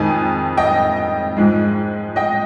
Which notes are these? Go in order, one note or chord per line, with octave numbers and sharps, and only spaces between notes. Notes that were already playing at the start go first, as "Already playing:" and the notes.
Already playing: F2 D#3 G#3 G#5
D#5 G5
G#2 F3 G#3
D#5 G5